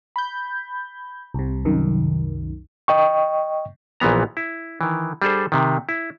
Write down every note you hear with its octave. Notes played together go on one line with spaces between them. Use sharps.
B5 G6
C2 C3
C2 F#2 D#3
D#5 G5 C#6
A#1 A#2 E3 B3 A#5
E4
D#3 E3
G3 D4 G#4 A4 C5
C3 D#3
E4